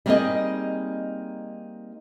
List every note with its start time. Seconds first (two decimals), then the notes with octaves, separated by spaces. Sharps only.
0.06 G3 A#3 C4 D#4 G#4 D#5